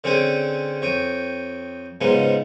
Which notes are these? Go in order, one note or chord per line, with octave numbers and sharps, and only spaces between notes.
D3 C4 C#4 G#4 G5 G#5
F2 C#5 G5 D#6
G#2 C#3 F3 G#3 B3 D#4